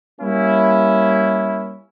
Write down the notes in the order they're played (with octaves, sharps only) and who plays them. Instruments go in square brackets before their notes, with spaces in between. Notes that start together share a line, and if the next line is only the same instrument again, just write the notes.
[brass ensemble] G3 A#3 C#4 E4